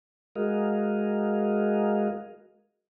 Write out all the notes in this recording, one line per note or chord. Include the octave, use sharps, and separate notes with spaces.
G#3 F#4 G#4 A#4 D#5 F5